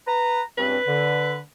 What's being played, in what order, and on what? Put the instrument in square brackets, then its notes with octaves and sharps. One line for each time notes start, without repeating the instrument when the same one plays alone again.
[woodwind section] B4 A#5
[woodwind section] C#2 G2 C4 [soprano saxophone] B4
[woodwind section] D3